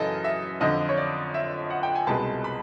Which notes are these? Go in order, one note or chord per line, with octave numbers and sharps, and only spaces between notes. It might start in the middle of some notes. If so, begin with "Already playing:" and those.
Already playing: F#2 C#3 E3 A4 D#5
E5
F2 D3 F3 D#5
C#5
D5
E5
F#5
G5
G#5
C2 B2 G#3 A5
B5